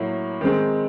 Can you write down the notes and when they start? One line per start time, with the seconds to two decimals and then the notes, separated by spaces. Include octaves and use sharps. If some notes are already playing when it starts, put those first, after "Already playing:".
Already playing: A2 F#3 A#3
0.41 D#3 G#3 C4